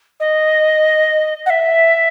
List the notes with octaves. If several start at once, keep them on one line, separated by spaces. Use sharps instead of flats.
D#5
F#5
E5